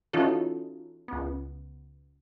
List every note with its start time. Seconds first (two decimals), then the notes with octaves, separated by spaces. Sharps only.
0.13 E3 C#4 D#4 F4 F#4 A4
1.08 C#2 B3